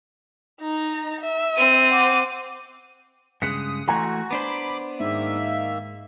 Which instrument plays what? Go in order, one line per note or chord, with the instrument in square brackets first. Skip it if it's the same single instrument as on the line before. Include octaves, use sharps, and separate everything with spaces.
[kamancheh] D#4 A#5
E5
[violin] C4 D#7
[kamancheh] F#5 D6
[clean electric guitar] G2 C#3 G#3 [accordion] D#6 [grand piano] F#6 B6 C#7
[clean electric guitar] E3 A3 [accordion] F#4 [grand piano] G#5 A#5 C6
[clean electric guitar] B3 D4 C5 [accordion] B5 D6
[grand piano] G#2 [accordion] D#3 A#3 E5